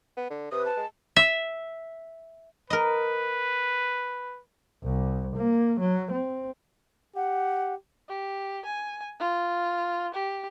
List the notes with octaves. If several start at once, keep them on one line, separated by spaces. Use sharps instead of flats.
B3
D3
C3 B4 D#6
A5
G#3
E5
A#4 B4 D#5
C2
A#3
F#3
C4
G4 F#5
G4
G#5
F4
G4